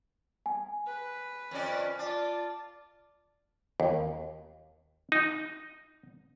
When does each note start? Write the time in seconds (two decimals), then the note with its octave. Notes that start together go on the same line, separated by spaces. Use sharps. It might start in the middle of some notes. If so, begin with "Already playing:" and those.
0.46 G#5
0.86 B4
1.51 F2 C#4 D5
1.99 F4 D5 A5
3.80 D#2
5.12 D#4